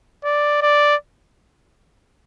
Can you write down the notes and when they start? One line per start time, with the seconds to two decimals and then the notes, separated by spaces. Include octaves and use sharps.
0.24 D5
0.62 D5